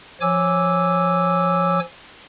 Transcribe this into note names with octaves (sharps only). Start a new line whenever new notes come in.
F3 C#5 G#5 D6 E6